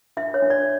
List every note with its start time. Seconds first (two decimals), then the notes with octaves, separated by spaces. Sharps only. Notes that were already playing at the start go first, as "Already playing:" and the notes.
0.17 D4 E5
0.34 C#5
0.42 D4
0.50 D5